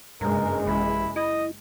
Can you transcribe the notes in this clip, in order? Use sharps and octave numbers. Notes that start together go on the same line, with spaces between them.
F#1 G2 G#3 A#4
A1 E4
E4 D#5